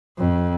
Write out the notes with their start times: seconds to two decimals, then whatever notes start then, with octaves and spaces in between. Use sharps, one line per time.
0.18 F2